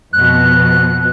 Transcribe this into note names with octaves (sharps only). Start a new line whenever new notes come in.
F2 B2 F#6